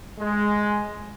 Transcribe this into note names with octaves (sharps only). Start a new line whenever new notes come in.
G#3